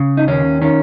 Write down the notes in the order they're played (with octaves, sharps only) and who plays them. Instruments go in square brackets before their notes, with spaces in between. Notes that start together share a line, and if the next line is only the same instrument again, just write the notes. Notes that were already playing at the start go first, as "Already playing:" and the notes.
Already playing: [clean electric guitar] C#3
D#4
D#2 C#4
D#3 C#4